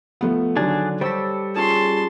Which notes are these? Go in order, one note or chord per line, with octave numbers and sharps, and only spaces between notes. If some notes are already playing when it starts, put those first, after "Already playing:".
F3 A3 B3
D3 D#3 F#3 D4 G#4 A5
G3 A4 C5 C#5 E6 B6
C#4 F4 G#4 A5 C6